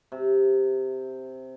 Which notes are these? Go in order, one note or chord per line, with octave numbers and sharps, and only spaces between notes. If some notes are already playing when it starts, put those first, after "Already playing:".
C3